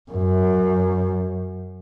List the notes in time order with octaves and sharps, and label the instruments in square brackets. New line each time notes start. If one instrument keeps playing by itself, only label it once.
[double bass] F#2